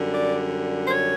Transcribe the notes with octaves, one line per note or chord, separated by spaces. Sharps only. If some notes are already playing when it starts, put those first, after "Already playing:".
Already playing: F#2 D3 G3
D5
C5
C#5